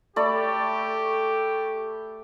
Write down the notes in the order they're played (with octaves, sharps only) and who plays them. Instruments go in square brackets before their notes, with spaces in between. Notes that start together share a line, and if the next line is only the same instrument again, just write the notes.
[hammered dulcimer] A3 D5 B5 [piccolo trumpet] G4